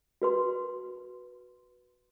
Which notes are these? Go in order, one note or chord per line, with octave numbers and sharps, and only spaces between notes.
F#4 B4 C6